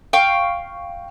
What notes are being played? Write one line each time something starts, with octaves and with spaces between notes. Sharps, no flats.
F5 G5 C#6